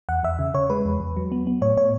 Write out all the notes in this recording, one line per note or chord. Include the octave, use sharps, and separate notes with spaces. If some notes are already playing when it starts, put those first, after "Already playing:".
E2 F#5
E2 E5
C#3
C#3 C#5
G#3 B4
E2
E2
F#3
B3
B3
A2 C#5
A2 C#5